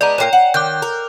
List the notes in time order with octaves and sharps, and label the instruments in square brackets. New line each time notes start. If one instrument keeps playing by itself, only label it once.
[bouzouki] G#3 B3 D4 [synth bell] D5 A#5
[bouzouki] A#2 G3 A#3 [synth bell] C#5 G5
[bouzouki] F#5
[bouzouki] D#3 [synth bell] D6 F#6 G6
[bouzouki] A#4